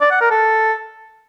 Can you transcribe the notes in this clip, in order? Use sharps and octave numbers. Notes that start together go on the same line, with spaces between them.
D5
F#5
A#4
A4